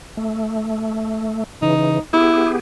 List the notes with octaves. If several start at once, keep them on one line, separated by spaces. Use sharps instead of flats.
A3
C#3 E3 D#4
B3 E4 G4 G#4